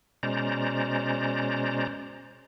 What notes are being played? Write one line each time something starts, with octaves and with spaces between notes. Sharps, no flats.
B2 G#3 C#4 C5 D5 A#5